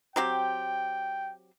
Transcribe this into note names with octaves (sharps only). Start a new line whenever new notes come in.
F#3 C4 G4 G5